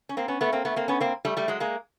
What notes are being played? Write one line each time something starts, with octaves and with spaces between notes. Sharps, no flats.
C#4
A#3 C4
B3 C#4
A3 B3
A#3 C4
A3 B3
A#3 C4
B3 C#4
A#3 C4
G3 A3
G3 A3
F#3 G#3
G#3 A#3